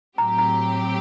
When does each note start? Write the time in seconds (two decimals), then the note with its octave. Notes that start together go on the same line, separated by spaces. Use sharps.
0.18 A2 F#3 C4 G4 A#5
0.38 A#5